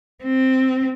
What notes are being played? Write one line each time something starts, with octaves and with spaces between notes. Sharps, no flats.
C4